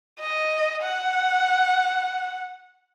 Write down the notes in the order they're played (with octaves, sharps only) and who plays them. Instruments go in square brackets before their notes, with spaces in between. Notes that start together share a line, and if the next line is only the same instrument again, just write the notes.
[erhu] D#5
F#5